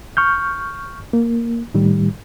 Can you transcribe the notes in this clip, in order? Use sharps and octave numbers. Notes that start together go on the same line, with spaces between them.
C#6 F6 G6
A#3
A2 D#3 G3